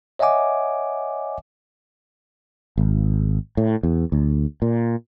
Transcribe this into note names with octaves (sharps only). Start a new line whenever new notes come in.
C#5 D#5 E5 F#5 G#5 D6
G#1
A2
E2
D2
A#2